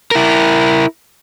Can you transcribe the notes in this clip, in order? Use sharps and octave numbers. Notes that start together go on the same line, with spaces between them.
E4 A#4